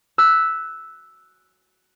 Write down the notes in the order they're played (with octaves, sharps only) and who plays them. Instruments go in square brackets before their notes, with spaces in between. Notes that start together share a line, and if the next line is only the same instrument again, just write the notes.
[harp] E6 F#6 B6